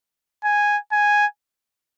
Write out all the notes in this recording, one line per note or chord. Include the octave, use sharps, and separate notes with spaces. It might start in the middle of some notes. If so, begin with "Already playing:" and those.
G#5
G#5